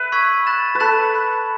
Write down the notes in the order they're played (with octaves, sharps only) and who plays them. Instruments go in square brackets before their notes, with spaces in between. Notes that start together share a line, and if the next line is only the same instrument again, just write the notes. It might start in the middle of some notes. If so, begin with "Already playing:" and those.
Already playing: [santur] B4 E5
[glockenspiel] C#6 E6 G#6 B6 F#7
B5 F#6 A6 E7
[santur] B4
[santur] A4 [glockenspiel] B5 F#6 A6 E7
[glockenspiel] B5 F#6 A6 E7